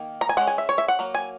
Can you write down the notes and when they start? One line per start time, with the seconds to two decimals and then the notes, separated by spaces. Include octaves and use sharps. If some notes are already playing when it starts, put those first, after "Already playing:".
Already playing: D#3 A#3
0.21 A#5
0.29 G#5
0.37 G#3 C#4 F#5
0.47 G#5
0.58 E5
0.69 C#5
0.78 E5
0.88 F#5
0.99 F#3 A#3
1.15 G#5